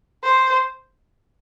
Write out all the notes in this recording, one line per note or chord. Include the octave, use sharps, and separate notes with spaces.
C5